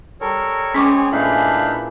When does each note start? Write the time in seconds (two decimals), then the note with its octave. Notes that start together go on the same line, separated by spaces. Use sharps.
0.21 G3 A4 A#4 C#5
0.74 G#3 C4 C#4 G#4 C#5 B5 C#6 D6
1.12 A#2 E3 A3 D4 D#4 F5 A5 B5